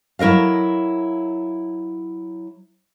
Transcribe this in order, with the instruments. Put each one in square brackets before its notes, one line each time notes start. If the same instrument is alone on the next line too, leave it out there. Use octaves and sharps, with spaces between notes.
[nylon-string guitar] F#3 E4 A#4 D#5 F5